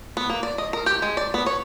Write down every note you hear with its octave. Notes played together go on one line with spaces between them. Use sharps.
B3
A#3
D5
D#5
A#4
G4
G#3
D5
B3
C#5